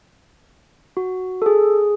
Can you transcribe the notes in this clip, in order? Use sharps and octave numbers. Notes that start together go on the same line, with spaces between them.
F#4
A4
G#4